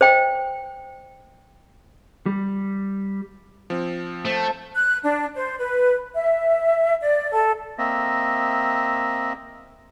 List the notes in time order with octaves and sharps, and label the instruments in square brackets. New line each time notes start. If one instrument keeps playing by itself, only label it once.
[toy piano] C5 D#5 G5
[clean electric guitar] G3
[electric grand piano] F3 C4
[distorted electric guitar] A3 [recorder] C5 [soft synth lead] A5
[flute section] F#6
D4
C5
B4
E5
D5
A4
[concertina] A#3 C4 D#5 E5